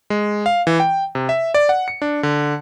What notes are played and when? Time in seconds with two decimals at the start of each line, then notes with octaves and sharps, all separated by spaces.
0.10 G#3
0.46 F5
0.67 E3
0.80 G5
1.15 C3
1.29 E5
1.54 D5
1.69 F#5
1.88 C#7
2.02 D4
2.23 D3